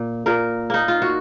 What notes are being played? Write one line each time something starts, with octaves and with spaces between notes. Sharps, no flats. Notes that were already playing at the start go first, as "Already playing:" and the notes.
Already playing: A#2
A#2 A#4
A#3 D#4
F4
F#4